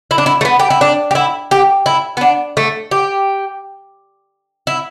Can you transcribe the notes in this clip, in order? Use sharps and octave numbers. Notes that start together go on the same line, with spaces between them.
E4
D4
E4
A3
B3
G4
E4
D4
G4
E4
G4
E4
B3
D4
A3
G4
E4